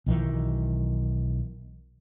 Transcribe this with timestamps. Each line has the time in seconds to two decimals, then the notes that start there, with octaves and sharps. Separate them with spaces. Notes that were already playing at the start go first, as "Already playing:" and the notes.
0.06 B1 D#3 E3